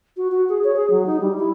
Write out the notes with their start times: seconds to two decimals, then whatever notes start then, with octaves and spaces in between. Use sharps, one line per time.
0.17 F#4
0.32 F#4
0.49 G#4
0.64 C#5
0.76 G#4
0.91 F#3
1.06 D#4
1.21 G3
1.39 E4